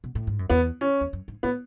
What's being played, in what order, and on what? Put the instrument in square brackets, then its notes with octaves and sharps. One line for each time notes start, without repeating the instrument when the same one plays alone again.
[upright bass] B2
A2
G#2
F#2
[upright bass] E2 [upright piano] B3
[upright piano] C#4
[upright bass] E2
F#2
G#2
[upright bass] A2 [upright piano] B3